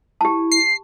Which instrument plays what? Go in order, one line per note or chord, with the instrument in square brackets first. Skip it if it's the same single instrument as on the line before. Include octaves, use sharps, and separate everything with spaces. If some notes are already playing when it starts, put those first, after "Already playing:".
[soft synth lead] E4 [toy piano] G4 A5
[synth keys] C7